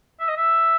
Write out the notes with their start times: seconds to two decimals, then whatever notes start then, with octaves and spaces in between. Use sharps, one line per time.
0.20 E5
0.28 D#5
0.37 E5